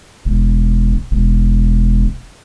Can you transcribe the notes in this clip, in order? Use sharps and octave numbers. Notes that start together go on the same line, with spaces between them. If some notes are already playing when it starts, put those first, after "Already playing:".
E1
E1